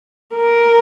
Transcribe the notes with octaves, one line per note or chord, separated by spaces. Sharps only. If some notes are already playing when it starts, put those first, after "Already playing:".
A#4